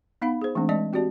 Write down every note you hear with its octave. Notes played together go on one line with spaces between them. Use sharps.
B3 D#4 F5 F#5 B5
G#4 C5
E3 G#3 A3 C4 D4
G#3 D5 D#5 A5
C4 F#4 G4 D5 A5